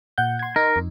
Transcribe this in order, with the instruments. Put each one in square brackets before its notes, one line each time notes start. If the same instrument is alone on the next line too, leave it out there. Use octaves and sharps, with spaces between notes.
[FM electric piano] A#2 F#5 G6
C6 G#6
[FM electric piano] D#4 [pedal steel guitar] A#4
[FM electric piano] F2